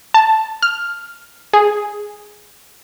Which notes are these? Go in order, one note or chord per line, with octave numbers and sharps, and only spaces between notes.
A5
F6
G#4